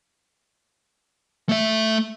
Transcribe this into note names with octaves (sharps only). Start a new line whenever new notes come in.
A3 E5